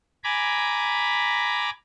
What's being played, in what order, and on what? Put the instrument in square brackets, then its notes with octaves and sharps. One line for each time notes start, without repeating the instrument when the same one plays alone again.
[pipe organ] G#5 A#5 B5 D6